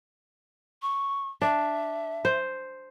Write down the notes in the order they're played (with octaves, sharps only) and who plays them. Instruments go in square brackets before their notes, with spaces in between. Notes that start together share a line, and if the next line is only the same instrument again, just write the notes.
[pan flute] C#6
[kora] D4 [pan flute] E5
[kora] C5